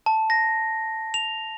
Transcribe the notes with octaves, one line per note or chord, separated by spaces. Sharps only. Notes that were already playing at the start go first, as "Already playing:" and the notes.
A5
A#6
F7